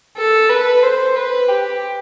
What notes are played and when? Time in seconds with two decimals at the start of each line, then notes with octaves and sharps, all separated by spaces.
0.17 A4
0.49 B4
0.83 C5
1.16 B4
1.49 G4